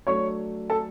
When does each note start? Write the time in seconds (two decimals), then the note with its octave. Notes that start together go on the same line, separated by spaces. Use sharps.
0.07 F#3 A3 D4 C#5 C#6
0.70 A4 A5